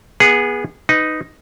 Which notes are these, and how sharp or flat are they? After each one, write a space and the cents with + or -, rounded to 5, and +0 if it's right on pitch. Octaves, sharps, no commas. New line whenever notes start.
B3 -25 G#4 -10 F#5 +0
D#4 +0 B4 +15